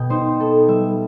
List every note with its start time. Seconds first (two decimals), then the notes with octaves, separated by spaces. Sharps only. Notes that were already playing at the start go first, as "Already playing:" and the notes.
Already playing: B2 G5
0.10 D#4 C5
0.39 B3 A4
0.68 G3 E5